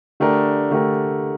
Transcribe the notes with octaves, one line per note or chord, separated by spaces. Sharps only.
D3 A3 D4 G4 A#4
D3 A3 D4 G4 A#4